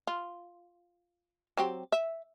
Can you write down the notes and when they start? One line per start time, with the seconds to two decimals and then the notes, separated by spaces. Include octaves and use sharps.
0.07 F4
1.57 F#3 C4 G4
1.92 E5